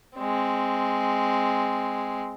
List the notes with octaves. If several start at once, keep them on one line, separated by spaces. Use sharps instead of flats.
G#3 C4